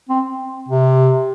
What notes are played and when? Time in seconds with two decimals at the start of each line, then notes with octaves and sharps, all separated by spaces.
0.09 C4
0.68 C3